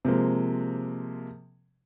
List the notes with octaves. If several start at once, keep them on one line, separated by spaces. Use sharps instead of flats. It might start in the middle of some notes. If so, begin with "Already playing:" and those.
C3 F3 G#3 A#3